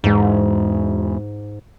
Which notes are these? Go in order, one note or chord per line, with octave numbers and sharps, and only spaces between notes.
E2 G#2 G#3